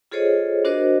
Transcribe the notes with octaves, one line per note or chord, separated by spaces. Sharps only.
F4 G#4 A4 C5 C#5 D#5
D4 F#4 A#4 C5 D#5